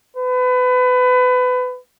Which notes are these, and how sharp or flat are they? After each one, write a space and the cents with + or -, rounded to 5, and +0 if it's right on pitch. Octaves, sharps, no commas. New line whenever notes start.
B4 +25